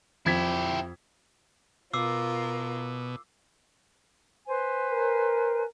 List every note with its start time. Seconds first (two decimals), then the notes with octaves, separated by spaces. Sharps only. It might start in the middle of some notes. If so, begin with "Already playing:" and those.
0.26 F2 E4 G4 G#6 B6
1.93 B2 F4 A#4 D6 E6 C7
4.48 B4 C5 G#5
4.91 A#4